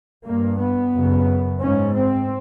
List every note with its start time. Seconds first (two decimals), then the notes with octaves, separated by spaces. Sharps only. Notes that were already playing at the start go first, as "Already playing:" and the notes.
0.25 G2 A#3
0.59 B3
0.93 F#2 C#3
1.61 G#2 C#4
1.96 C4